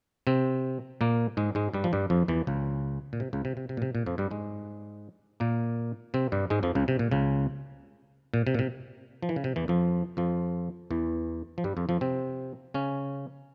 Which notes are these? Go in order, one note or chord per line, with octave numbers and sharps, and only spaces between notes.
C3 C4
A#2 A#3
G#2 G#3
G#2 G#3
G2 G3
F3
G2 G3
F2 F3
E2 E3
C#2 C#3
A#2
C3
C#2 C#3
C3
C3
C3
A#2
C3
A#2
F2 F3
G2 G3
G#2 G#3
A#2 A#3
C3 C4
G2 G3
G#2 G#3
F2 F3
C#2 C#3
C3
A#2
C#2 C#3
A#2
C3
A#2
C3
F3
E3
C#3
C3
E2 E3
F2 F3
F2 F3
E2 E3
F3
G2 G3
F2 F3
F2 F3
C3 C4
C#3 C#4